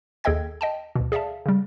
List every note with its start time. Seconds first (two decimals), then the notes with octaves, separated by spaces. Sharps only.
0.24 D#2 G#4 A4 D#5 G5 G#6
0.61 D#5 G5 A5
0.96 D2 B2
1.12 G#4 D5 E5 F5 A5
1.46 C#3 G3